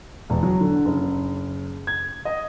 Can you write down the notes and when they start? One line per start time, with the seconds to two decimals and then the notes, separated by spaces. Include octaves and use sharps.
0.30 E1
0.43 F#3
0.60 D3
0.85 F#1
1.87 G#6
2.25 D#5